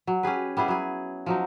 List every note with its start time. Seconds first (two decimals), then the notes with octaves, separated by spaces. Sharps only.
0.07 F#3
0.23 C#4 G4 G#4 B4
0.57 G3 B3 E4 G#4
0.68 F#3 G#4
1.26 F3 F#3 D#4